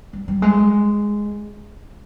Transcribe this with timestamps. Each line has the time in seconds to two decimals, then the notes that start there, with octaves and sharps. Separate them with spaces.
0.13 G3
0.28 G3
0.42 G#3